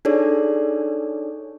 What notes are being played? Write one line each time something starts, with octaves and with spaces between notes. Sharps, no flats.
D4 D#4 G#4 A4 C#5 D5